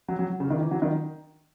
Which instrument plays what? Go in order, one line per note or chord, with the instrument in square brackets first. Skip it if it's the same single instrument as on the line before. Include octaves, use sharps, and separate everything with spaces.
[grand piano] F#3
F#3
C#3
D#3
E3
F#3
D#3